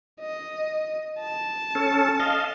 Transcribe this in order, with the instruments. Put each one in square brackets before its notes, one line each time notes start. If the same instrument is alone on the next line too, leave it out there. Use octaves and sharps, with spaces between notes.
[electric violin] D#5
A5
[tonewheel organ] C#4 A4
D#5 F5